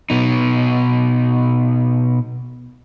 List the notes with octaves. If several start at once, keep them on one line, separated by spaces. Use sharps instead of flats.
B2 D#4